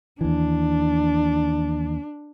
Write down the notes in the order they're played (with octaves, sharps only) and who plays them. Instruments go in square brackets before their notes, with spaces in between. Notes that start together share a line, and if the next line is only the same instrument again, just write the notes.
[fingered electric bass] D#2 E3 [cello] D4